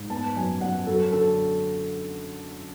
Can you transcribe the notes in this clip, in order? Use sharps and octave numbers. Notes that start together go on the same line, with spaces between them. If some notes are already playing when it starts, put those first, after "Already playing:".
Already playing: G#2
B3 A5
F#2 G#5
F#2 F#5
F#3 A4
D3 A4